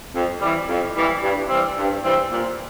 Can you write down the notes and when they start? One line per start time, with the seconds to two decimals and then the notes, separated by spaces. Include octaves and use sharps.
0.14 F2
0.40 E3 G3
0.68 F2
0.95 E3 G3
1.22 G2
1.49 E3 G3 C4
1.77 G2
2.04 E3 G3 C4
2.31 A#2